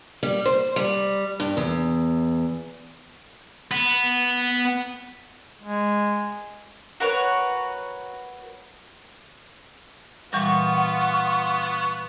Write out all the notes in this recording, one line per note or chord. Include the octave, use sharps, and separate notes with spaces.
G3
C5
G3
G2
E2
B3
G#3
F#4 A#4 B4 C#5
A#2 E3 G3 B3 F4 F#5 C#6